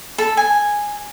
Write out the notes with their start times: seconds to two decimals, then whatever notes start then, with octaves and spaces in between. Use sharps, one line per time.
0.18 A4
0.37 G#5